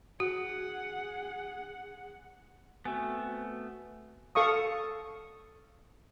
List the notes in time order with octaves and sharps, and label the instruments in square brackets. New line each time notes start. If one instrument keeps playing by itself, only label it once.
[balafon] F#4 [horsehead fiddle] G#4 F#5
[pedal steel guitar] A3 B3 [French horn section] C4 F#4 [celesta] G#5
[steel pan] A4 F5 C#6 D#6